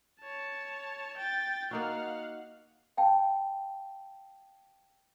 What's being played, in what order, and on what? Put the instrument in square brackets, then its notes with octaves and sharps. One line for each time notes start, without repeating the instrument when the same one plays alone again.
[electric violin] C#5 A5
G5 A6
[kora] A#3 D#4 F#4 [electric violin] F5 F#5
[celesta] F5 G5 A5